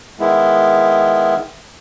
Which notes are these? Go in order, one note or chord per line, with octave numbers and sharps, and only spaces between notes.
D#3 G#3 B3 E4